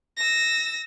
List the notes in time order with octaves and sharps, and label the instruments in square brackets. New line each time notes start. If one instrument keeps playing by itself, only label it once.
[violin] E6 A#6